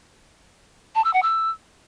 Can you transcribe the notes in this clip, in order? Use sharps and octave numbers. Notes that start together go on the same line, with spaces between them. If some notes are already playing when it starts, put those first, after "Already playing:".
A5
E6
F#5
E6